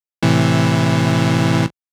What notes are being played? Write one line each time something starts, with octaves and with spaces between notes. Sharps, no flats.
A2 C3 E3